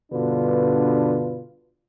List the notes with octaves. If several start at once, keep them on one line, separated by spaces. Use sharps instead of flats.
G2 B2 D3 D4 F4 B4